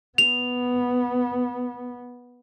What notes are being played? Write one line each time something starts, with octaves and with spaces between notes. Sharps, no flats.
B3 F7